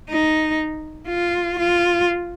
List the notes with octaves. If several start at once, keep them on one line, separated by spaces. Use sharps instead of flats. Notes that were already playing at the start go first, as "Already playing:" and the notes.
D#4
F4
F4